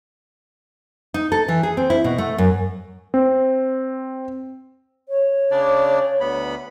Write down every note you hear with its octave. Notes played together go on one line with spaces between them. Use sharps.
D#4
A4
E3
G#4
C4
E4
B2
A3
F#2
C4
C#5
C#3 D4 D5
D2 B3 B5